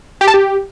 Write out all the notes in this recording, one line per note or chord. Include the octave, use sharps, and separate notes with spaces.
G4
A5
G4